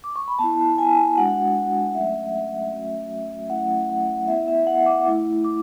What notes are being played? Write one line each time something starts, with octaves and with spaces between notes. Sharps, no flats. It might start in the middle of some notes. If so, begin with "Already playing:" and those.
D6
C#6
B5
B3 E4 A5
G#5
G#3 D4 F#4 F#5
F#3 A3 C#4 E5
F#5
E5
F#3 A3 C#4 F#4
F#3 A3 C#4 E4 F#5
F#5
B3 E4 E5
E5
F#5
D6
A3 E4
D6